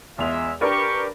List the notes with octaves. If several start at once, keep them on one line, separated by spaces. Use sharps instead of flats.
E2 G#3 F4 E5 F7
D4 G4 A#4 B4 C#6